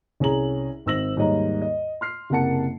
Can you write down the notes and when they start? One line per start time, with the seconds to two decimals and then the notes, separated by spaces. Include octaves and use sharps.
0.20 C2 C#4 G#4 A#5 F#7
0.86 G#1 C4 E6 A#6 F#7
1.16 D#2 G#2 G3 C#5 D#5 A#5
1.62 D#5
2.01 C6 F6 C7
2.30 F#1 C3 A#4 F#5 A5 C#7